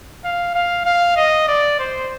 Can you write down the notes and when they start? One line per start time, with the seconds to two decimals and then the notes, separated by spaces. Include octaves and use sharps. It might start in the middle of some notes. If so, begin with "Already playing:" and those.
0.25 F5
0.55 F5
0.86 F5
1.17 D#5
1.48 D5
1.79 C5